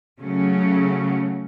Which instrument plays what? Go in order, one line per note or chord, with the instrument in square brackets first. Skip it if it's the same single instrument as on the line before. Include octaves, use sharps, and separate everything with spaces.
[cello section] C#3 F#3 A3 C#4